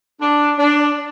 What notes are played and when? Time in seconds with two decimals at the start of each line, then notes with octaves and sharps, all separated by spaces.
0.21 D4
0.58 D4